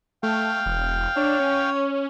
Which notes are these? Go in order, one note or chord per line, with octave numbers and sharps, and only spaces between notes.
A3 F5 G5
E1
D4 C#5
C#4